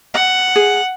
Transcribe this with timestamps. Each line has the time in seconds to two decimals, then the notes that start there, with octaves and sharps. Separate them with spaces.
0.14 F#5
0.56 G#4